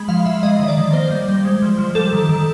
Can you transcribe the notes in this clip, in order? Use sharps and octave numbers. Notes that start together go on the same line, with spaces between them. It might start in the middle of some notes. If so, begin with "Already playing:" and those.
Already playing: G#3 B5
F3 F5
F3 E5
G#3 D#5
D#3 D#5
D5
D#3
A#3 C5
G3
G3
G#3
F3
F3
G3 A4
D#3
D#3